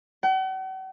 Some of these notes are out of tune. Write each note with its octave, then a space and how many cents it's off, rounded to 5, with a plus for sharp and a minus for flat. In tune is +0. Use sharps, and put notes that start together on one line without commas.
F#5 +45